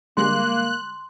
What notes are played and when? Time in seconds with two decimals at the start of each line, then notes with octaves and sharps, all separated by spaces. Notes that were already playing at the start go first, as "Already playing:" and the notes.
0.17 D3 G3 G#3 A#3 C6 F#6